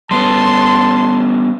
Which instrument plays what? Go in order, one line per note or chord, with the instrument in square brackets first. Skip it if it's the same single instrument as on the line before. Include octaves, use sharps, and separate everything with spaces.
[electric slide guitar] G3 B3 C#4 [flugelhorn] A5 [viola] C6